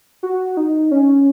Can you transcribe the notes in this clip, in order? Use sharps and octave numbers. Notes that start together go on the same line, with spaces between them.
F#4
D#4
C#4